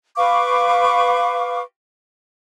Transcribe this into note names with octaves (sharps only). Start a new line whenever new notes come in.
B4 F5 C#6 D6